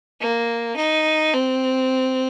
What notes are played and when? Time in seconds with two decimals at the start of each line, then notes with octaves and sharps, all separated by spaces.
0.20 A#3
0.77 D#4
1.34 C4